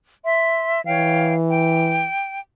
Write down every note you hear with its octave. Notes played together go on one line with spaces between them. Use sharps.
E5 C6
E3 C#5 F5 G5
G5